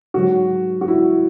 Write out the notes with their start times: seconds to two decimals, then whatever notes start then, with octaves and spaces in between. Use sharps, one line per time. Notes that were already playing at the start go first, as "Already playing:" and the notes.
0.14 G#2 F#3 F#4
0.81 F#4
0.88 E4